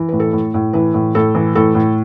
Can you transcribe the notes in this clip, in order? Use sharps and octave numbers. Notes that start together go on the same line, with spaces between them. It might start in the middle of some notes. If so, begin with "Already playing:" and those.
Already playing: E3
A2 B4
A4
A2
A2
E3 B4
A2
A2 A4
E3
A2 A4
A2